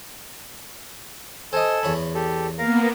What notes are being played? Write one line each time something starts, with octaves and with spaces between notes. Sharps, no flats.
A4 C5 D#5 G#5 E6
E2 C#5 B5
G4 A4
A#3 B3 A#4 F5 A#5